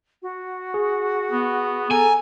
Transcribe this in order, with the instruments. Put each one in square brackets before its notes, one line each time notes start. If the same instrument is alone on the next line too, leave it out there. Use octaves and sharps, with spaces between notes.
[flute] F#4
[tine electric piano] G#4
[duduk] B3
[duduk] A4 [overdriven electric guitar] G#5 [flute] A#5